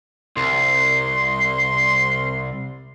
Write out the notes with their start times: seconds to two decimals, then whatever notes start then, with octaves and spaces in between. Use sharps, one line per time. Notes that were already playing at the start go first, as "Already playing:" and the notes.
0.37 C2 C6